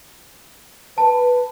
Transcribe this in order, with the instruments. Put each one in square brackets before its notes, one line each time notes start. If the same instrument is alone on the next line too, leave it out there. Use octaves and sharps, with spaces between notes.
[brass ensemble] B4 [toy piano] A5